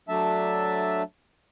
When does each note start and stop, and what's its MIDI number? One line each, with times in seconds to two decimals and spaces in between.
0.09 1.03 54
0.09 1.03 57
0.09 1.03 62
0.09 1.03 76
0.09 1.03 81